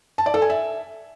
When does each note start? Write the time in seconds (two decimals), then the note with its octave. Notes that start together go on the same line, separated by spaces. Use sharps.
0.18 A5
0.26 D5
0.34 A4
0.42 G#5
0.50 E5